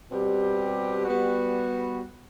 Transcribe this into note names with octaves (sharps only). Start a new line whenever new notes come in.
B2 G3 C4 G4
G3 B3 F#4